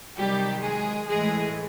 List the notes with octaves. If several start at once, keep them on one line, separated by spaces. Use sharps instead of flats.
C3 D#3 F#3 G3 G4
G#3 G#4
A2 E3 G#3 G#4